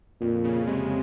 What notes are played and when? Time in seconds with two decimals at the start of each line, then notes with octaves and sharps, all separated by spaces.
0.21 F2 A#2
0.44 C#3
0.67 C3 G#3